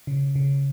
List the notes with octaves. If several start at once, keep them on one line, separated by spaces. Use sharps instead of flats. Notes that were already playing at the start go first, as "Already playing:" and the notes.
C#3
C#3